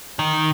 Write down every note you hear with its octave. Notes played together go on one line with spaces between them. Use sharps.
D#3